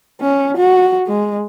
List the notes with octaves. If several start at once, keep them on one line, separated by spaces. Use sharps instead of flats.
C#4
F#4
G#3